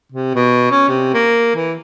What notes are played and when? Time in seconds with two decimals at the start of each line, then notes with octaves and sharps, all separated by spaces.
0.12 C3
0.35 B2
0.71 C#4
0.89 C3
1.14 A#3
1.55 E3